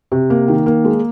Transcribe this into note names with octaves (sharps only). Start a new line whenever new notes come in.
C3
A#3
D#3
A#3
G#3